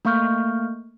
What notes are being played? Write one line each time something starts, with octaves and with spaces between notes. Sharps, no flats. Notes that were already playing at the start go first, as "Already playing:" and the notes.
A3 A#3 F5 C#6 F6 G6